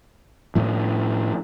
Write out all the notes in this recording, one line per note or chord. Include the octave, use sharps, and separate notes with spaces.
A2 F3